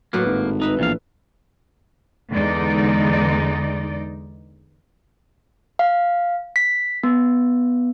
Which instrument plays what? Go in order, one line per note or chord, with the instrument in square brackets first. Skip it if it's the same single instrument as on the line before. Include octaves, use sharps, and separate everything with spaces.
[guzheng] A2 B4 F#5 [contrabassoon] F#3 [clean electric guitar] A#3
[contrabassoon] G#1
[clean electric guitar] D#4 [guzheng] B4 E5 B5
[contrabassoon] A#1 [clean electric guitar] E2 F5
[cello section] E2 D3 G#3 D#4 D5
[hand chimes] F5
B6
B3